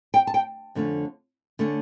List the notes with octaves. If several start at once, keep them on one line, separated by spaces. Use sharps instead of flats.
G5
A5
G5
F2 D3 A3 C#4
D3 A3 C#4